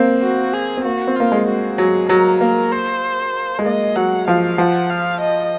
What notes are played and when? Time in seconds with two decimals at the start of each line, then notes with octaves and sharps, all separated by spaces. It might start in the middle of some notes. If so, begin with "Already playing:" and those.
Already playing: A#3 C4
0.23 F#4
0.53 G#4
0.77 C4
0.85 A#3 F#4
1.07 C4
1.16 A#3 F4
1.32 G#3
1.47 F#4
1.78 F#3 G#4
2.09 F#3 A#4
2.41 A#3 A#4
2.72 C5
3.59 G#3
3.65 A#3 D#5
3.96 F#3 F#5
4.28 F3 F5
4.58 F3 F#5
4.90 F5
5.21 D#5